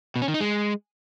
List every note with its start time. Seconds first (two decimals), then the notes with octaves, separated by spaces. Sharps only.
0.16 B2
0.22 C#4
0.28 D#3
0.34 D#4
0.40 G#3